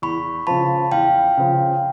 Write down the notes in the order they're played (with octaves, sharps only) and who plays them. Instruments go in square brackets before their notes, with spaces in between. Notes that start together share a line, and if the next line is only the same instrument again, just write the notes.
[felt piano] E2 [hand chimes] B5 C#6
[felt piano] C#3 F3 [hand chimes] A5 B5
[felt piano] E2 [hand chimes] F5 G5
[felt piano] C#3 F3